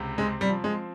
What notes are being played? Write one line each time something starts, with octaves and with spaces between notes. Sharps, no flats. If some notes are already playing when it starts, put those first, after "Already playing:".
Already playing: C#2 C3
G#3 C4
G3
F3
G#3